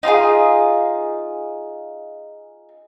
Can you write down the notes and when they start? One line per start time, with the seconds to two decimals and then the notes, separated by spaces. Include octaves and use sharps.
0.03 D#4 F4 F#4 G#4